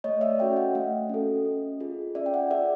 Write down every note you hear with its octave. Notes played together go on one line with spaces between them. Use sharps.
A3 C#5 D#5
D5 E5
C#4 F#4 A4 F5 G5
E5 F#5
A3 D#5 F5
C#4 F#4 A4
C#4
F4 G#4
C#4 D5 E5
G5
E5 F#5
F4 G#4 D5 E5